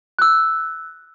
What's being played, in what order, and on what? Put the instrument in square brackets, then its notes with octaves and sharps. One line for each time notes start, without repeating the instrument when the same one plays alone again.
[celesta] E6 F#6